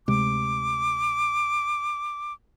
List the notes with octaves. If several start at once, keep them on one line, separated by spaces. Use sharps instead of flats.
D2 C3 G#3 D6